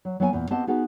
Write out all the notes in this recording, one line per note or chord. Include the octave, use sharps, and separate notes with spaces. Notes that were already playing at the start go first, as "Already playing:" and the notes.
F#3
F#3 A#3 B3 A#4 F5 G#5
E2 A#2
B3 C4 G4 D#5 A5
B3 D#4 F#4 G#4 A#4 B4